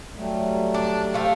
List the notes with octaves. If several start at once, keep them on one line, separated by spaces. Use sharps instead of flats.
F#3 G3 A3
D4
A3 G4 C5 E5 F5